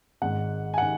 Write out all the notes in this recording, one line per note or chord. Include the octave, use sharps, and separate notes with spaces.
G#1 G#2 D#3 F#5
G#5
F#5
D#3